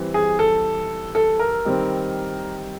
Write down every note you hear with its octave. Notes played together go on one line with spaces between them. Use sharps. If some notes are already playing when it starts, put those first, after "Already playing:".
Already playing: E3 G3 C4
G#4
A4
A4
A#4
D#3 G3 C4